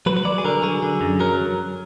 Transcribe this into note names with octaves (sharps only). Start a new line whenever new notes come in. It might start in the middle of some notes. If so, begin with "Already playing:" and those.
F#3 B4
B4
F#3 D5
G#4
D3 A#4
F#3 G#4
D3
F#2
F#3 A#4